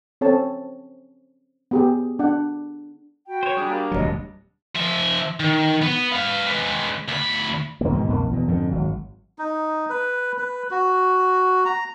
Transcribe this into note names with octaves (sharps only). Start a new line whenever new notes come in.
C4 C#4 A4 C#5 A5
B3 G4 G#4
D4 F#5
F#4 G5 B5
C5 C#5
G3 D4 G#4
A#3
D1 G#1 F#3 D#5
F3 E5
D#3
B3
B4 F5
G#3 B4
D2 B5
E2 C#3 A#3
G#2 B2 D#3
B1 F2 A#3
E2 B2
F2 G#2 D3
G#1 F#3
D#4
B4
B4
F#4
A#5